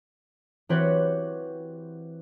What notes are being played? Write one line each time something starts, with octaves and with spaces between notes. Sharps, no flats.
E3 C4 F#4 G4 B4 C#5